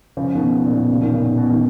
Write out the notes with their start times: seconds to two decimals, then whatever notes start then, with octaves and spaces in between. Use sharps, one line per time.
0.17 C#3 F3
0.35 B2 D#3
0.53 B2
0.65 A#2
0.77 B2
0.89 A#2 C#3
1.01 B2 D#3
1.14 A#2 C#3
1.25 B2
1.38 B2
1.50 B2 D#3